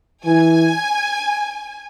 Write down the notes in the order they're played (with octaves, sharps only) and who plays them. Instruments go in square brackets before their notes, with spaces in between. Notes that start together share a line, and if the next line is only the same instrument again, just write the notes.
[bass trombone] E3 [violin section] G#5